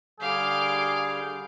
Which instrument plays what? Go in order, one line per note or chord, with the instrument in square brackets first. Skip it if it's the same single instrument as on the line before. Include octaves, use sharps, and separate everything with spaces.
[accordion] D3 G3 G6 [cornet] G#4 [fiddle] F5 D6